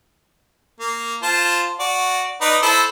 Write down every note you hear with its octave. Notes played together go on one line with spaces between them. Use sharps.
A#3
F4 C5 A5
F#4 D5
D#4 B4 D5
E4 A4 C5